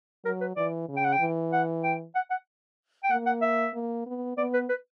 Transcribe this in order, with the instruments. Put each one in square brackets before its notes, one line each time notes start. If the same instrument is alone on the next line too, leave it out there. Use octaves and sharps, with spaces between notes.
[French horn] F#3 [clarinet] A#4
[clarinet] B4
[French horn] E3 [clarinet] D5
[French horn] C#3
[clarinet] G5
F#5
G5
[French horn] E3
[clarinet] F#5
G5
F#5
F#5
G5
[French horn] A#3 [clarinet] F#5
[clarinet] F#5
E5
[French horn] A#3
B3
[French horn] B3 [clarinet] D5
[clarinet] B4
B4